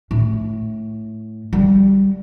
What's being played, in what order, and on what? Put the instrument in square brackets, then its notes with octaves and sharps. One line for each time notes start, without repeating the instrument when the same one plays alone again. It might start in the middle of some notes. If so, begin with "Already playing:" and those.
[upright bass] A2
G3